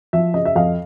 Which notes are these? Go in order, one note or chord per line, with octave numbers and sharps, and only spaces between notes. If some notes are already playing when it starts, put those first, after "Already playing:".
F3 E5
C#3 D#5
E5
F2 D#5 F5